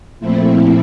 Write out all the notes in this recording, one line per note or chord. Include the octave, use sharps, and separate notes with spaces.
A#2 F3 A3 C4 E4